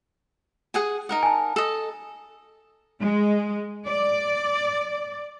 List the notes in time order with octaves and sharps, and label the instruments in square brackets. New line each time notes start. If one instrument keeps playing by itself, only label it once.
[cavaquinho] G#4 F#5 G#5
D#4 A#4 F#5
[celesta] G#5 A5
[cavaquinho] A4 D#5
[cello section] G#3
D5